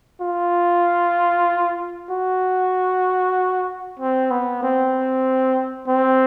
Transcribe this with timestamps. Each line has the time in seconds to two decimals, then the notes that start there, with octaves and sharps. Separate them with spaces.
0.21 F4
2.10 F#4
4.00 C4
4.31 B3
4.63 C4
5.88 C4